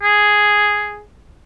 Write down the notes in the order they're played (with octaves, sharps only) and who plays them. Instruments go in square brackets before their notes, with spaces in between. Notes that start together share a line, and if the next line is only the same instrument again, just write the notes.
[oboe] G#4